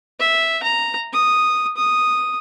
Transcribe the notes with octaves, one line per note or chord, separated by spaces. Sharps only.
E5
A#5
D#6
D#6